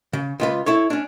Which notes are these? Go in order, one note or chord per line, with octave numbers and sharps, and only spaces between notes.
C#3
C#2 F4 B4
E4 A4 C#5
C#4 D4